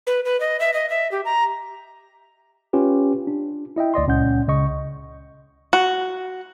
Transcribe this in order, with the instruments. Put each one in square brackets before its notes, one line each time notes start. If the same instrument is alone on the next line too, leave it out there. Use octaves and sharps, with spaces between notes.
[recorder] B4
B4
D#5
E5
D#5
E5
G4
A#5
[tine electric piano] C#4 F4 G4 B4
D4
E4 D#5 E5 G5
D2 D5 D#5 C6
C#2 A#2 C#4 F#5 G6
C#2 C#3 D#5 C#6
[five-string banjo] F#4